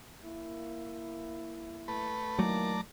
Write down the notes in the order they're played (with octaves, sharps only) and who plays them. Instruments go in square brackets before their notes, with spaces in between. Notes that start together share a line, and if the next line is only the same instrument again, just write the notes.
[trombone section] A#3 E4
[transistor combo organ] A3 B4
[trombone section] D#3 E3 A#3 [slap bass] F#3 A3 [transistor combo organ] D5 A5 A#5